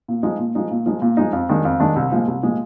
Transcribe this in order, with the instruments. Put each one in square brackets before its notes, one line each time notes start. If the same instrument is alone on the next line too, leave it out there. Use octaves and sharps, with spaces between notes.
[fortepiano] A#2
F3 G#3 D#4
A#2
F3 G#3 D#4
A#2
F3 G#3 D#4
A#2
F3 G#3 D#4
F2
D#3 G#3 D4
F2
D#3 G#3 D4
C2
A#2 F3 G#3
C2
A#2 F3 G#3